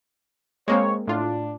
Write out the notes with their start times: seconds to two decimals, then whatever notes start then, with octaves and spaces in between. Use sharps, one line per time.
0.68 G#3 A#3 C4 C#5
1.08 A2 D4 F4